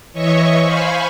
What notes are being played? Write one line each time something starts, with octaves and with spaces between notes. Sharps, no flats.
E3 C#5 D#5 E5 C#6
C5 F5 G#5 B5 C#6